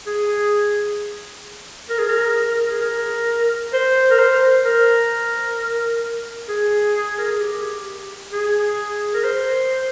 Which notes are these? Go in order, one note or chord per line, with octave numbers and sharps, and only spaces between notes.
G#4
A#4
G#4
A#4
G#4
A#4
C5
A#4
C5
A#4
G#4
A#4
G#4
G4
G#4
A#4
C5